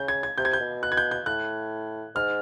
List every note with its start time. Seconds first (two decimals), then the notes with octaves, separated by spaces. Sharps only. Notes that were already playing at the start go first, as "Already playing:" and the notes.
Already playing: C#3 G6
0.08 G#6
0.23 G#6
0.38 C3 G6
0.45 G#6
0.53 G6
0.60 B2
0.83 F#6
0.92 G#6
0.97 G6
1.11 G6
1.26 A2 F#6
2.15 G#2 F6